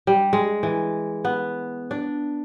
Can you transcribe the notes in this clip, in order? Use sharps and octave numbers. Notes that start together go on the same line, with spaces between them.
G3
G#3
E3
B3
D4